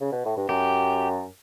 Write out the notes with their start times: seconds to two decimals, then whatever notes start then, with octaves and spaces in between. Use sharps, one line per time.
0.01 C#3
0.12 B2
0.25 A2
0.37 G2
0.48 F#2 G4